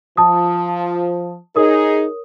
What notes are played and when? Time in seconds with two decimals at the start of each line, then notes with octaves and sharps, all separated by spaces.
0.17 F3 A5 D#6
1.56 D#4 G#4 A#4 C#5 D#6